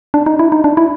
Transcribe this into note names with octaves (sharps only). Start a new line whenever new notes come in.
D4
D#4
E4
D#4
D4
E4